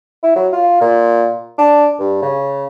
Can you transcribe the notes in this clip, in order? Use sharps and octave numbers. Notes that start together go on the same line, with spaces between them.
E4
F#3
F4
A#2
D4
G2
C#3